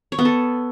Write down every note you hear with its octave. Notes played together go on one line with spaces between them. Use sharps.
C#5
B3
A4